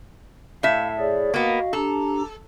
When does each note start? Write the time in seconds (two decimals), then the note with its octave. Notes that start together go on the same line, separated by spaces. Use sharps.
0.63 A2 E5 F5
0.99 G#4 C#5 D5
1.34 A#3 B3 F#4 D#5 F5
1.73 D4 G4 A4 A#5